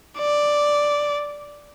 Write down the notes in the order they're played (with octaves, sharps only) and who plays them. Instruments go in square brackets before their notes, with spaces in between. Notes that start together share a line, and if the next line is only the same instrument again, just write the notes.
[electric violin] D5